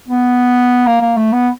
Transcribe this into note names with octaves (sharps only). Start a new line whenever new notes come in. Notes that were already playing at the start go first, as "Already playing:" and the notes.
B3
A#3
A#3
A3
B3